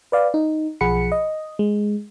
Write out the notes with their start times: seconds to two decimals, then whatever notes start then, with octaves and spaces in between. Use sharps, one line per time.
0.12 B4 D5 F5
0.34 D#4
0.81 B1 F3 G#4 F#5 B5 C#7
1.12 D#5
1.59 G#3